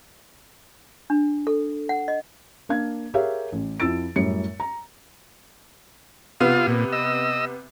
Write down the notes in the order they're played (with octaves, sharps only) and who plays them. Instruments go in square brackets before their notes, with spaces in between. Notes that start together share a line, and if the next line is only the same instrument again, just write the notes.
[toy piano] D4
A4
F#5
D#5
[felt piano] A#3 D4 F5 G#6
G4 G#4 A#4 C#5 E5 F5
A1
F2 E4 E6 A6 D7
F#2 A2 G3 C#7
A#5
[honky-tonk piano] C3 B3 [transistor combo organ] F4 F5
[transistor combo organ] A#2
D#5 E6